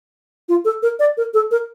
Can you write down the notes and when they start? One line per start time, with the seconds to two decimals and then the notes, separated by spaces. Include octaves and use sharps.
0.49 F4
0.65 A4
0.82 A#4
0.99 D5
1.17 A#4
1.34 A4
1.51 A#4